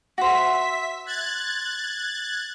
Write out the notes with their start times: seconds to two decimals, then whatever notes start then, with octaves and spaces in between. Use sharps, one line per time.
0.18 F#4 C5 E5 B6
1.06 F#6 G#6 A6